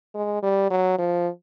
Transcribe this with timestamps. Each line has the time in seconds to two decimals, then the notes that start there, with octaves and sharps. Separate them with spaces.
0.15 G#3
0.42 G3
0.71 F#3
0.99 F3